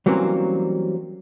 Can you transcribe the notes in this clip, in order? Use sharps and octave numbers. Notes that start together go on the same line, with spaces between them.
E3 F#3 G3 A#3 C4 C#4